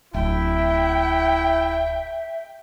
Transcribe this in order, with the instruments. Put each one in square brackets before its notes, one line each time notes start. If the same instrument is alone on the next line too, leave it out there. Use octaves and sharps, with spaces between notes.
[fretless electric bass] D1 [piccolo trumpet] E4 [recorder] E5 [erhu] G5